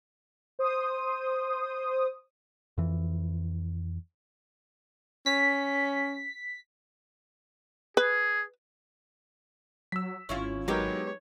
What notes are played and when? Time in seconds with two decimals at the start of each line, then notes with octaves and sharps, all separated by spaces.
0.59 C5 D#6
2.78 F2 E3
5.26 C#4 B6
7.97 G#4 B4
9.92 F#3 E6 B6
10.29 G#1 C#4 E4 F4
10.68 F#3 G#3 B3 D#4 G4 A#4 C#5